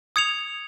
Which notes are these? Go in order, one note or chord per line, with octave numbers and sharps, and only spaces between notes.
D#6 G#6 C#7 F7